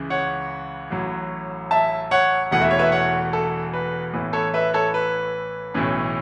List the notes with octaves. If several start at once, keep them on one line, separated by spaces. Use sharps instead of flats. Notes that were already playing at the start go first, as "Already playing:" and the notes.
Already playing: C#2 C#3 E3
C#5 F#5
A1 A2 F#3
E5 A5
C#5 F#5
E1 E2 E3 A3 F#5
E5
C#5
B4 E5
C#5 F#5
A4
B4
A1 A2 E3 B3
A4 C#5
B4 E5
A4 C#5
B4
B1 A2 E3 C#4